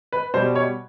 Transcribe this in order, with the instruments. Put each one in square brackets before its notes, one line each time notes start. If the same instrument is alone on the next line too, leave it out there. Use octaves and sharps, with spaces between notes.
[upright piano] B4
B2 G3 C5
C#5